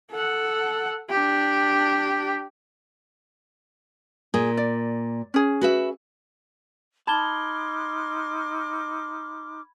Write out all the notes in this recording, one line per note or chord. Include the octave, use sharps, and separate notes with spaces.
A4 F#5
D4 G4
A#2 G#4
D5
C#4 G#4
F#4 B4 E5
D#4 A5 B5 C6 D6 F6 G#6 G7